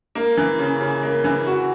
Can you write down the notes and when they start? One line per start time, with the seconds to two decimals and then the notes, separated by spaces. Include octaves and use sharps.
0.15 A#3
0.37 E3
0.59 C#3
0.81 C#3
1.03 A#3
1.24 E3
1.46 F#4